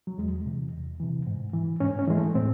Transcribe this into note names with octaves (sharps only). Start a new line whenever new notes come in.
F#3
E2 G#3
C3 E3
E2
C3 E3
G#2
E3
G#2 C#4
C#4
E3 G#3
A3
A2 C4